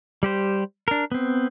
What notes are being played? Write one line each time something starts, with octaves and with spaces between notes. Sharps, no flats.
G3 G4 C5
D4 A#4
B3 C4